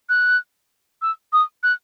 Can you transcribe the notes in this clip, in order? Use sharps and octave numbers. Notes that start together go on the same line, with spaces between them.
F#6
E6
D#6
F#6